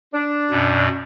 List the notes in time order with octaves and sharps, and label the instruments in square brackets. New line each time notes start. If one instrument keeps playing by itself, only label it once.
[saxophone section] D4
[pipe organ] F#2 B2